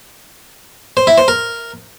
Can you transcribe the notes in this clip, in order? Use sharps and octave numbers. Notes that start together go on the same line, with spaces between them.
C5
E4
C5
A#4